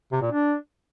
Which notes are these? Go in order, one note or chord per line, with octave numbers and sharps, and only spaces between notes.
C3
A#2
D4